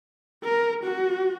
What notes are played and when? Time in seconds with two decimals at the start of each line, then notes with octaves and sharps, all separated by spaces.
0.44 A#4
0.84 F#4